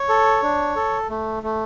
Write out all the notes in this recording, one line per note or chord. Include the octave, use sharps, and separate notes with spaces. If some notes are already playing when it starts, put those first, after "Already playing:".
Already playing: C#5
A4
D4
A4
A3
A3